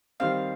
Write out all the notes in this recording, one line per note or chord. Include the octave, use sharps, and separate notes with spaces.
D#3 G3 C4 F5